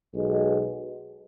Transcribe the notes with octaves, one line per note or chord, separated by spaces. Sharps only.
B1 B2 G#3